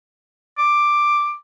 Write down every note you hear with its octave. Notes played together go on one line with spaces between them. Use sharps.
D6